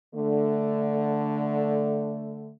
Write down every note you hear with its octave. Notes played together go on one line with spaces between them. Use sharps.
D3 A3